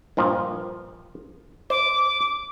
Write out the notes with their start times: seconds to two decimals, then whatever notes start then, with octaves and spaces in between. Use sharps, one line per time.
0.17 G2 A#2 F3
1.70 C5 D6